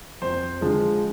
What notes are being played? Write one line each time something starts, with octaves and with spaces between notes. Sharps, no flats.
F2 C5
D3 F3 G#3